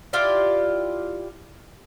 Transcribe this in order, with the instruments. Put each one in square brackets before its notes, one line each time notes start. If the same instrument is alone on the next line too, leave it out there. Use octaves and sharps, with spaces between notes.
[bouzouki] E4 F4 G4 D5